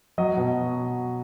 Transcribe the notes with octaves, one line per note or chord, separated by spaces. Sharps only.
F#3 D#5
B2